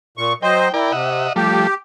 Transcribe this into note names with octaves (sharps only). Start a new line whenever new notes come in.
A#2 C#6
F#3 C5 D#5 G5
E4 A#4 D5 G5
C3 D#5 E5 F#5
F3 G3 A3 G4